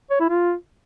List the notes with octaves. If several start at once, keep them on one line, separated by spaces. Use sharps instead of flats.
C#5
E4
F4